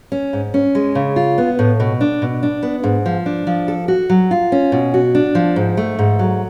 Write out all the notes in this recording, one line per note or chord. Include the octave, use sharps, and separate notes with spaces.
C#4
G#2
C#4
G#3
C#3
F4
B3
A2
B2
D4
B2
D4
B3
G#2
F3
D4
F3
A4
F#4
F#3
F4
C#4
B2
F#4
D4
F3
G#2
A3
G#2
F#3